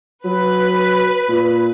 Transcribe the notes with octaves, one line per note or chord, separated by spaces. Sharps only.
F#3 B4
A#2